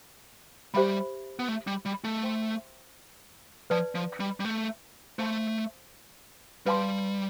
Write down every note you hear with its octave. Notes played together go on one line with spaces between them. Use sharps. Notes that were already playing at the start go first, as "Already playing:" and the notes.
G3 G4 C5 E5 B5
B3
A3
G3
G3
A3
C5 E5 G5 C6
F3 B4 D5 A5
F3
G3
G3
A3
A3 C5 F5 A5 C6
G3 B4 F5 A5 C6